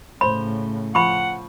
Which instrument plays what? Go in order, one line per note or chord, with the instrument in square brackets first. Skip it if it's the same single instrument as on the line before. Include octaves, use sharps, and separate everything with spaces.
[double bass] A2 C#3 [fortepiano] C5 [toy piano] B5
[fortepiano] F3 [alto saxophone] F#5 [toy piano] B5 C#6